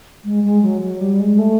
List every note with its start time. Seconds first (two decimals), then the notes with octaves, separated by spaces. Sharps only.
0.25 G#3
0.44 G#3
0.63 F#3
0.82 F#3
1.01 G3
1.20 G#3
1.39 A3